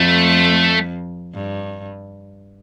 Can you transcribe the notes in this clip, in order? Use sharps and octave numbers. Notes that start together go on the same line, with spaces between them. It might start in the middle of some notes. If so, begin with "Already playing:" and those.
Already playing: F2 A3
G2